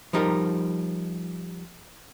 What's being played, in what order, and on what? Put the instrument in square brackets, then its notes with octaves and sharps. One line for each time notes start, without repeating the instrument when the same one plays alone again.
[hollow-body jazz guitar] F3 G3 D#4 G4 A#4